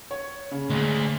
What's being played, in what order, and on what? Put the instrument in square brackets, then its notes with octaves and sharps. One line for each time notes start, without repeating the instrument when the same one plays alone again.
[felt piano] C#5
C#3
[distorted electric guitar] D2 [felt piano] G#3